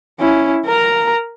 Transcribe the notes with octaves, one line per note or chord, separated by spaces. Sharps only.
C#4 E4
A#4 A#5